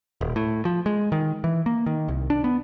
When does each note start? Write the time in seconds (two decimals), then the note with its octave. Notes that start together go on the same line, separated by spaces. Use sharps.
0.21 D#1
0.36 A2
0.65 F3
0.86 G#3
1.12 D#3
1.44 E3
1.66 A#3
1.86 D#3
2.08 C2
2.30 D4
2.44 B3